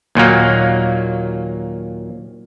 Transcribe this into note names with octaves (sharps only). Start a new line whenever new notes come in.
D#2 A#2 F#3 A#3